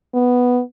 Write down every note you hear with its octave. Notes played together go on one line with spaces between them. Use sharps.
B3